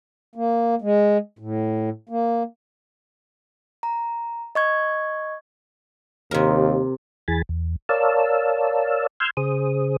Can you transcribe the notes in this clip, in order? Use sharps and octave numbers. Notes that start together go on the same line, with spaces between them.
A#3
G#3
A2
A#3
A#5
D#5 C#6 G#6
D#2 C3 A#4
E2 E3 G#4 G#5 B5 A6
E2
A#4 C#5 D5 F5 A5 E6
C6 E6 F6 G6 G#6
C#3 G#4 C5 D#6